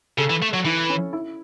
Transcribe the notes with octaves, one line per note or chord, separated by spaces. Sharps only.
C#3 A4
E3
A3
F#3
E3 E4
C#4
E4